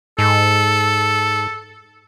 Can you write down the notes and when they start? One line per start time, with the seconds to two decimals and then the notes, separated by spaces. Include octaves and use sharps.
0.19 G#2 A4